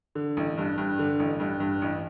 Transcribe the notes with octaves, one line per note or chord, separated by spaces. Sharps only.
D3
A1
G2
G2
D3
A1
G2
G2
A1